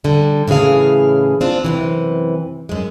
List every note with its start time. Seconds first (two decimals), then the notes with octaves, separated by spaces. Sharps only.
0.04 D3 G3
0.48 A2 C#3 E3 G#4 F5
1.41 C4 D4 F4
1.64 F#2 C3 E3
2.69 F#2 G#3